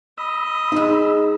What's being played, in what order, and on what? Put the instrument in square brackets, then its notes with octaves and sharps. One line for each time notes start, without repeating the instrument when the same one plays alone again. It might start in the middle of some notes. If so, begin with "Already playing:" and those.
[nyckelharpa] D#5 [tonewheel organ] B5 E6
[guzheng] G#3 B3 C5 [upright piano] D#4